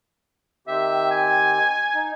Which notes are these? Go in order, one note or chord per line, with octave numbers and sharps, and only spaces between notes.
D#3 C4 G4 E5
G#5
D#4